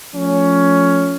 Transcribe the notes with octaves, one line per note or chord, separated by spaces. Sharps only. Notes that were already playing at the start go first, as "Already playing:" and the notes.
F3 A3 C#4